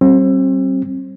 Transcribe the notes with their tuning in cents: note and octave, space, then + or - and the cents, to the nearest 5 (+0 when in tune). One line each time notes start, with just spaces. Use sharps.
G3 -35 C4 +35